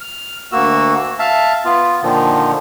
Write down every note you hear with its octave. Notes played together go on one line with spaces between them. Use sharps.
F6
D2 A#3 F#4 E6
E5 F5 A5
B3 F4
A#2 D3 D#3 F3